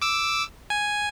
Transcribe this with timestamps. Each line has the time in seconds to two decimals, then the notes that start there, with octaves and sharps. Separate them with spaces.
0.02 D6 E6
0.70 G#5